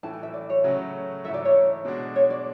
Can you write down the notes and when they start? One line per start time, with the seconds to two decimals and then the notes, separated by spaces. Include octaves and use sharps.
0.03 A2 E3 A3 A5
0.13 G#5
0.23 E5
0.34 D5
0.49 C#5
0.64 C#3 F#3 A3 C#4 F#4
1.24 G#2 E3 A3 E4 A4 E5
1.34 D5
1.45 C#5
1.85 B2 G#3 D4 F#4
2.16 C#5
2.30 D5